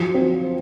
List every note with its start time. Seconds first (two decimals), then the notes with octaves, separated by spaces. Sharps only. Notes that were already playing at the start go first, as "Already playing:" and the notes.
Already playing: F3 F#3
0.14 C4